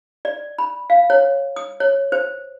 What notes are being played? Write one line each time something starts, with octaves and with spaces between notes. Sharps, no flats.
D5
B5
F5
C#5
D#6
C#5
C5